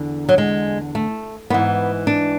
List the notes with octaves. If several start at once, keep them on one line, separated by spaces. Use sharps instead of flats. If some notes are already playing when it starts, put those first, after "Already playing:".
Already playing: E2 D3
F#3
G#3
A3
G#2 E3 B3
D4